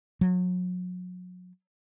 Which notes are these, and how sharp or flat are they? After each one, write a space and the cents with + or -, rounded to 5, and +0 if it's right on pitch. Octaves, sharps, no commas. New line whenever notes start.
F#3 -35